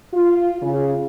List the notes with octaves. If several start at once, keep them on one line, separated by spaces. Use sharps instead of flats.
F4
C#3